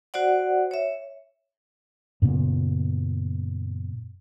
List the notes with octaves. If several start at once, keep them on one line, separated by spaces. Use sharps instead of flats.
F#4 C5 D5 F#5
C#5 E5
F#2 A#2 C#3 B3